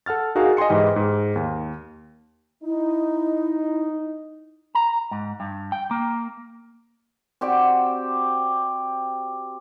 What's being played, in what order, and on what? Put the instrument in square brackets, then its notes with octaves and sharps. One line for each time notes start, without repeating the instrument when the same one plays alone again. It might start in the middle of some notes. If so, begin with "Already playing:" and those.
[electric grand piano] A4 F#5 F6 A6
D#4 F#4 G#4 A#4 F5
D#5 G5 G#5 C6 C#7
G#2 E3 G4 D#5
G#2
D#2
[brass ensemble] D#4 [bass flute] E4
[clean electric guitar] A#5
G#2
G2
G5
A#3
[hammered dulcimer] C4 F#4 G4 D5